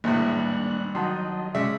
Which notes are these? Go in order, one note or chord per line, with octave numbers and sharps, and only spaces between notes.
G#1 E2 A2 G3 A#3 D4 F#6
D#3 F#3 D#5 F#5 A5 C6
C#3 G#3 D5 E5 B6